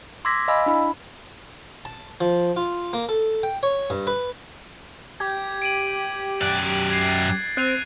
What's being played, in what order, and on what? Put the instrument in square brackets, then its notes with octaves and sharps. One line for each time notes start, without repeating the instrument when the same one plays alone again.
[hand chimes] C6 D6 E6 G#6 A#6 B6
D#5 F5 G#5 B5 E6
D4 E4 B5
[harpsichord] A5
F3
F4
A#3
A4
G5
C#5
G2
B4
[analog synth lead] G4 [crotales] G#6
[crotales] D7 D#7 F#7
[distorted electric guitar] F#2 D5 [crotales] F#6
[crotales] G#6 C7
A6
[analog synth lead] C4 [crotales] F#6 D#7 F7